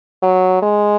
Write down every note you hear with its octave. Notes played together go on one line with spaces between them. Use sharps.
F#3
G#3